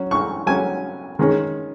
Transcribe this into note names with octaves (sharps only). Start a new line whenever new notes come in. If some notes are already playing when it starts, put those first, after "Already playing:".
Already playing: F#3 C#4
C#6
F#3 C#4 G#5
D#3 G#3 C#4